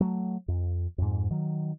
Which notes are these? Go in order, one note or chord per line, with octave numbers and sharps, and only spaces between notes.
F#3 A3
F2
F2 G#2
D#3 F#3